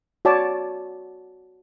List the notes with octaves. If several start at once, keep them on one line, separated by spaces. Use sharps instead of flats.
F#4 C#5 D5 A5 D6